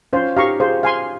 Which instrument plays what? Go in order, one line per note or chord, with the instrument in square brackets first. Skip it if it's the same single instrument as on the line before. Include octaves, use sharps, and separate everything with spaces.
[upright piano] C#4 F4 [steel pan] C5
[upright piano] D#4 G4 [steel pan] F5 A#5 C#6
[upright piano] F4 G#4 [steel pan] C5
[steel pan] F5 G#5 C6